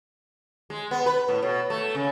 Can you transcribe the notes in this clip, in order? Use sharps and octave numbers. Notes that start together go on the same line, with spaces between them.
G#3
B3
B4
A2
B2
A3
C#3